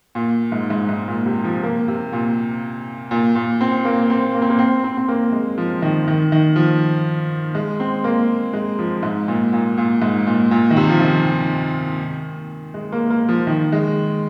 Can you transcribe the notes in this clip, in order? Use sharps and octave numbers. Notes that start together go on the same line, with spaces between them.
A#2
G#2
G#2
G#2
A#2
C3
F3
A#3
C3
A#2
A#2
A#2
C4
A#3
C4
A#3
C4
A#3
C4
C4
C4
A#3
G#3
F3
D#3
D#3
D#3
F3
G#3
C4
A#3
G#3
F3
G#2
A#2
A#2
A#2
G#2
A#2
A#2
D#3
C3
F3
D#3
G#3
A#3
A#3
F3
D#3
G#3